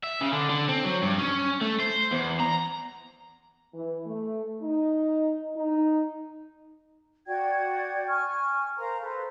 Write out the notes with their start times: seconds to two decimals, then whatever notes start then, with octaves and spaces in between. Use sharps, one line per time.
0.03 E5
0.21 C#3
0.33 D3
0.50 D3
0.69 C4
0.84 F#3
1.03 G2
1.18 C#4
1.61 A3
1.80 C5
2.12 E2
2.40 A#5
3.74 E3
4.06 A3
4.62 D#4
5.57 D#4
7.27 F#4 D5 G5 G#6
8.08 G#5 C#6 F6
8.78 A#4 C5 F5 A#5
9.02 A4 B4 C5